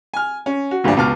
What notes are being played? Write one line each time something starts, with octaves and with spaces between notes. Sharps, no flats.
G#5 F6
C#4
F#4
D2 G2 A#2 F3 D4
C#2 B2 A5 D6 F6